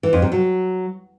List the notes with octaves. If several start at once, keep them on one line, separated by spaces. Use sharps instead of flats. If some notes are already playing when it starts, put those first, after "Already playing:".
E3
F2
C3
F#3